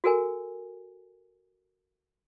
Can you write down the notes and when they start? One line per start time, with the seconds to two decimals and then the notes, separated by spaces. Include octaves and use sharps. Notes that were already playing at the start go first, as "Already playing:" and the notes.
0.04 F#4 A4 A#4 G#5